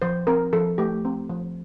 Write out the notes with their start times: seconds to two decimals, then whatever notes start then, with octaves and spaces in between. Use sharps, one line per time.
0.02 F3 C5
0.27 C4 A#4
0.53 F3 A4
0.78 A3 G4
1.05 C4
1.29 F3